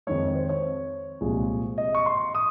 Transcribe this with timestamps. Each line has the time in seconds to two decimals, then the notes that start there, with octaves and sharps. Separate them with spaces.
0.07 F2 D#3 G#3 C#5
0.36 C5
0.49 C#5
1.21 C2 A#2 F3 G#3
1.78 D#5
1.95 C#6
2.06 C6
2.35 D#6